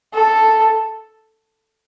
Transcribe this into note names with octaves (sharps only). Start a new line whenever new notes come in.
A4